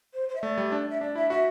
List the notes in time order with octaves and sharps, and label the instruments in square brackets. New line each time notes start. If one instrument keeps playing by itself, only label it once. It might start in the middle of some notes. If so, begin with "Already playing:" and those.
[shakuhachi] C5
C5
E5
[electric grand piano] A3 [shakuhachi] D5
[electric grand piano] G3
D4
[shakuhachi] E5
[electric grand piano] D4 [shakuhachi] D5
[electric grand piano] E4 [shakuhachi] E5
[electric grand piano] F#4 [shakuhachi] E5